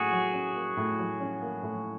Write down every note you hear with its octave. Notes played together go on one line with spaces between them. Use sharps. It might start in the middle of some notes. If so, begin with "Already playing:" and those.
Already playing: A2 F#3 A#3 C#4 F#4 G#4
F#3
C#4
A#3
A2
F#3
C#4
A#3
A2